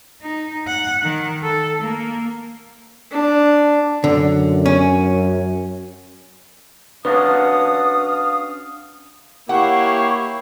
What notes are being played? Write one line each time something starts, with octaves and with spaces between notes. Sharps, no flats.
D#4
F#5
D#3
A4
A#3
D4
F#2 D3
C#4
C#4 D4 F#4 B4 F5 D#6
A#3 E4 G4 C#5 F5 F#5 C#6